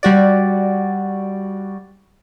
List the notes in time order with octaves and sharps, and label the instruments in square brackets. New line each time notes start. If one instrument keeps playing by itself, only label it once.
[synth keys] G3 F#4 D5